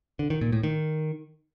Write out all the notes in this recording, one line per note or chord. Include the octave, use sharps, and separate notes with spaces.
D3
D#3
A#2
A2
D#3